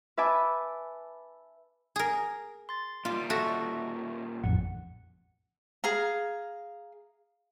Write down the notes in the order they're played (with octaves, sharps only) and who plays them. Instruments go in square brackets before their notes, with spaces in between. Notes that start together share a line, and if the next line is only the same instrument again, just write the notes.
[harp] B4 E5 G#5 A5 D6
[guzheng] G#4 A#4
[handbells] C6 A6
[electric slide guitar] A#2 G3 [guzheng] F4
[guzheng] F#4 A4 [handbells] E5 C#6 A#6
[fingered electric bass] A1 F2 [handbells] F#5
[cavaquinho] G#4 F5 A#5